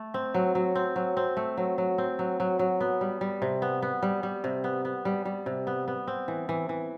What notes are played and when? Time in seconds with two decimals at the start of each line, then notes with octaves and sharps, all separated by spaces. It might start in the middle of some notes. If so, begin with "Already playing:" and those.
Already playing: A3
0.14 C4
0.34 F#3
0.55 F#3
0.75 C4
0.96 F#3
1.17 C4
1.37 A3
1.57 F#3
1.78 F#3
1.98 C4
2.19 F#3
2.40 F#3
2.59 F#3
2.81 B3
3.01 G3
3.21 G3
3.42 C3
3.62 B3
3.82 B3
4.02 G3
4.23 G3
4.44 C3
4.64 B3
4.85 B3
5.05 G3
5.25 G3
5.46 C3
5.67 B3
5.88 B3
6.08 C4
6.28 E3
6.49 E3
6.69 E3